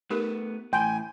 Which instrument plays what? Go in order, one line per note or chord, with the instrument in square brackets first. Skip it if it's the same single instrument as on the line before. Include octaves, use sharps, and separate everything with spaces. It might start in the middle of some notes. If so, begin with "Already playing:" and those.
[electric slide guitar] A3 B3 [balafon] D#4 G4 A#4
[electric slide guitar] A2 E3 [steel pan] G5 [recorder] G#5 [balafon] C6